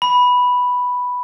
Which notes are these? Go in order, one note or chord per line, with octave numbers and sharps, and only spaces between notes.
B5